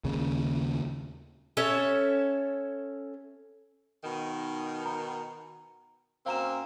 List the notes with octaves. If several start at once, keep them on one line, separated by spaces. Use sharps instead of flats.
D#2 A#2 C#3
C#4 A4 C#5 E5
B2 D#3
A#5
F#2 A#3 C4 F5 A#5 E7